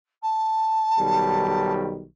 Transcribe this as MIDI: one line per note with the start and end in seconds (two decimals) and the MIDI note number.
0.22 1.72 81
0.99 2.05 35
0.99 2.05 51
0.99 2.05 55